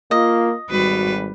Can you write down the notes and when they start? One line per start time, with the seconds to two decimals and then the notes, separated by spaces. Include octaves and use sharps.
0.11 A#3 F4 D#5
0.70 G#1 G3 F#4 B4